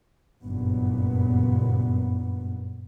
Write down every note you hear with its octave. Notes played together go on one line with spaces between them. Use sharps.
F#1 G2 A#2 B3